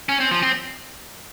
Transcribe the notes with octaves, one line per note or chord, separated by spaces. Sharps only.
C#4
C4
F3
C4